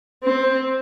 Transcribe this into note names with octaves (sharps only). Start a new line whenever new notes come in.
C4